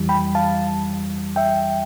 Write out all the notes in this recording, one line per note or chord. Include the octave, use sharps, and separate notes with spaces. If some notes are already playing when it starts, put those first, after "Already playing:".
Already playing: F2 E3 G3
G5 B5
F5 A5
E5 G5